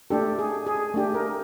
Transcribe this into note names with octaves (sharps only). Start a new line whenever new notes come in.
A3 D4 G4 A4
G#4
G#4
A3 D4 G4
A#4